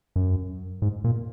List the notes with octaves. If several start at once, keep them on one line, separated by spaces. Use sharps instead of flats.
F#2
G#2
A#2